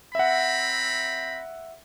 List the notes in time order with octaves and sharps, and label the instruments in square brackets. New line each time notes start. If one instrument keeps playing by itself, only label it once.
[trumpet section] C4 A#5 B5 [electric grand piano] E5 F#5